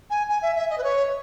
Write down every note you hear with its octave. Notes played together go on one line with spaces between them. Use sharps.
G#5
G#5
E5
E5
D#5
B4
C#5